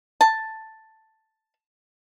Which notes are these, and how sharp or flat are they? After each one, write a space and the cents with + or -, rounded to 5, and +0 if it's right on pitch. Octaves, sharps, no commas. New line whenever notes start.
A5 +5